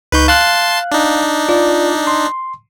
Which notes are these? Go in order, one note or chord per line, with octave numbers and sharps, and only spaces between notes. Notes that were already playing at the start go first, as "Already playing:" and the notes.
C#2 D#4 B4 C#6 G6
F5 A5 C6 F#6
D4 D#4
F4 D5
C6